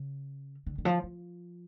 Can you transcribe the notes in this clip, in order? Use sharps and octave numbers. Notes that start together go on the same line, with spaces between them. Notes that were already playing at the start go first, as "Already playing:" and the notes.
Already playing: C#3
D3
D3
F3
F3